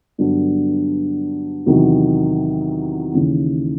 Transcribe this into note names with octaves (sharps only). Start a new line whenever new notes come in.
G2 D3 F#3 B3 D4
E2 C3 D#3 F#3
D#2 C#3 E3